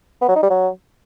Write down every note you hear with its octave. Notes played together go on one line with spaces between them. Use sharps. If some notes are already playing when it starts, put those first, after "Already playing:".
B3
F#3
D#4
G3
F#3